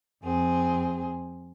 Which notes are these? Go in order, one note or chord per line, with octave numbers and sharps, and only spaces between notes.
F2 C4 G#4